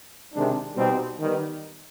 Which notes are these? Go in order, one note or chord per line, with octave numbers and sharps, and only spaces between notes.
C3 D#3 G#3 D4
B2 G3 C4 D#4 G4
D#3 G3 B3